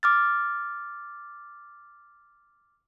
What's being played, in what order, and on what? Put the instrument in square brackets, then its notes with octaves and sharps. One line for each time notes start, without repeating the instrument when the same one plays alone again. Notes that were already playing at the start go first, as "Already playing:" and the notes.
[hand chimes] D6 F6 A6